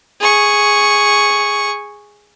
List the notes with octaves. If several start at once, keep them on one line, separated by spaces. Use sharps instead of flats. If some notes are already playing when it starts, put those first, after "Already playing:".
G#4 C#6